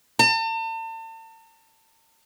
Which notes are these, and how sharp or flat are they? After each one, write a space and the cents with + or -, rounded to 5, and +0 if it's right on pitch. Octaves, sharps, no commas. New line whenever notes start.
A5 +40